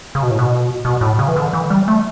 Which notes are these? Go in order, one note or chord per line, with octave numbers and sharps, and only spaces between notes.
C#3
B2
A2
B2
B2
A2
C#3
E3
D3
E3
G3
A3